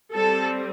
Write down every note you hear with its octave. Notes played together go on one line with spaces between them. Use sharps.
G3 C4 A4